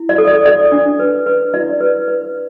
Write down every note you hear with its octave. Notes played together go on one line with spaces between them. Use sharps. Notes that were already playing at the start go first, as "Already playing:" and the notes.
Already playing: E4
D5
A4
D5
A4 D5
D4
B4
B4
E4 D5
B4
B4